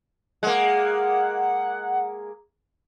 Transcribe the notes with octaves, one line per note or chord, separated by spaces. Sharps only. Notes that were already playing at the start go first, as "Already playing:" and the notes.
G#3 A#3 F#5